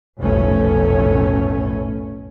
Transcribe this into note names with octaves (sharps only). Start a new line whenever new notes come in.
F1 B1 F#2 A2 A3 C#4